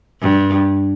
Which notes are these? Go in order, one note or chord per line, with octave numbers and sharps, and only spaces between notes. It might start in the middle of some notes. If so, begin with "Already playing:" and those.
G2